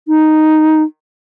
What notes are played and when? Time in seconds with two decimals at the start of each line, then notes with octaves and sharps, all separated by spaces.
0.08 D#4